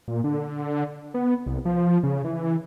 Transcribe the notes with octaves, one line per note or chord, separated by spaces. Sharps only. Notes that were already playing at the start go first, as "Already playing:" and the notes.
A#2
D3
B3
C2
F3
C#3
E3